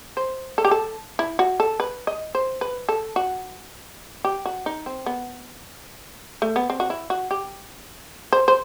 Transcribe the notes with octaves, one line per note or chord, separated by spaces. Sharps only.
C5
A4
G4
A4
E4
F#4
A4
B4
D#5
C5
B4
A4
F#4
G4
F#4
D#4
C4
B3
A3
B3
C4
F#4
E4
F#4
G4
C5
C5